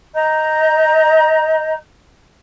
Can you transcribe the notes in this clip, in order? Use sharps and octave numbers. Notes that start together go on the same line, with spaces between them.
D#5 A#5 G6